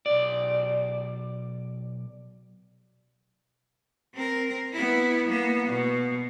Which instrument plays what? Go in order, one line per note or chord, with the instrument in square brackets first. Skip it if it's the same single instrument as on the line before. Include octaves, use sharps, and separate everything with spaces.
[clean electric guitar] B1 D5
[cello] C4 A#4
B3 E4
A#3 B3
B2